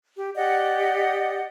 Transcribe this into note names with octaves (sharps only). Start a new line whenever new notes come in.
G4
G4 D5 D#5 F#5